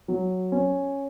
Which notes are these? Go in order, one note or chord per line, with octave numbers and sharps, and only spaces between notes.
F#3
C#4